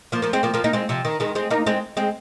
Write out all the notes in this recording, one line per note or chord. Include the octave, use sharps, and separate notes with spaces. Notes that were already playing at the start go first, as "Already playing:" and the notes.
F3 A#3
F3 A#3
G#3 C4
F3 A#3
F3 A#3
A#3 D#4
G#3 C4
C3 F3
D#3
D#3 G#3
G#3 C4
A#3 D#4
G#3 C4
G#3 C4